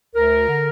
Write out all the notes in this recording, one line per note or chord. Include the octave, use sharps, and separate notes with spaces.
D2 A#4
D3